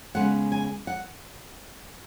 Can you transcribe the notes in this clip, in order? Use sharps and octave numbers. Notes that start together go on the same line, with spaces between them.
C#3 G#3 B3 F#5
G#5
F#5